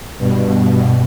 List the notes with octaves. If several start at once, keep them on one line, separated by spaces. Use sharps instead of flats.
G2 B2